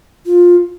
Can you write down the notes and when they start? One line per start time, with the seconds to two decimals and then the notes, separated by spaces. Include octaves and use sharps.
0.26 F4